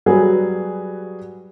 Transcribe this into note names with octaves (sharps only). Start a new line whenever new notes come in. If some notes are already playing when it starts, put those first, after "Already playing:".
F#3 G3 F#4 G#4 B4